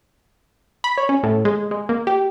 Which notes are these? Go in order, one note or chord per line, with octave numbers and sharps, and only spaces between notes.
B5
C#5
C#4
A2
G#3
G#3
A#3
G4